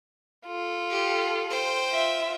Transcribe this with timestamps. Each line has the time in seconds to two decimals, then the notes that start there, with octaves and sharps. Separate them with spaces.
0.47 F4 A4
0.91 G4
1.50 C5 G5
1.91 F4 E5